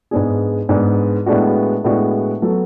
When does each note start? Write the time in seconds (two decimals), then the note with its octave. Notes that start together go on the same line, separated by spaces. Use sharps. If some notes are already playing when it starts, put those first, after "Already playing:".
0.11 G#2 G#3 B3 D4 G#4
0.69 G#2 G#3 B3 D4 G#4
1.26 A2 G#3 B3 D4 F#4
1.84 A2 G#3 B3 D4 F#4
2.42 F#3 B3 F#4 A4